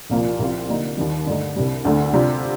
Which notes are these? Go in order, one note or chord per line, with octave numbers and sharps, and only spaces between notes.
C2 A#2 F3 A#3 F4
C2 C3 F3 C4 F4
D3 G3 A#3 D#4
D#2 D#3 G3
G2 D3 A3 D#4
C2 C3 G3
D2 D3 A3
C3 G3 D4 F4